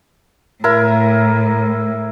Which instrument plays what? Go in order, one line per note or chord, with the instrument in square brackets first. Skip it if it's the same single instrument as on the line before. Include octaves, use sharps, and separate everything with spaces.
[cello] A2 [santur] E4 A#4